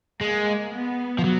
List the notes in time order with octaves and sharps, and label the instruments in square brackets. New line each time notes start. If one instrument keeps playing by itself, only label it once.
[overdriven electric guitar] G#3 [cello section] A#3
[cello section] B3
[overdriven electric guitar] F3
F#3